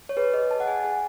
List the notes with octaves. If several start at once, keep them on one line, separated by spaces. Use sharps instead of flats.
C#5
G#4 B4
G#4 D#5
G#4 A5
F#5
G#4 G#5
G#4 G#5